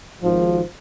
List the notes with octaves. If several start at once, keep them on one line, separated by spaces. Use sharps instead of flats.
G#1 F3